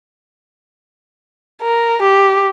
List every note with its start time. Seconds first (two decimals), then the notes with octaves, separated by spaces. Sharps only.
1.62 A#4
2.02 G4